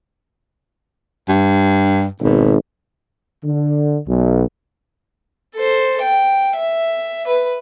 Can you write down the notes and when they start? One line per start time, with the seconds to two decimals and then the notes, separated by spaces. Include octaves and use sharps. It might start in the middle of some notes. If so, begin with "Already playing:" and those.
1.28 G2
2.21 G#1 B2
3.45 D3
4.06 B1
5.55 A4 C5
6.01 G5
6.56 E5
7.27 B4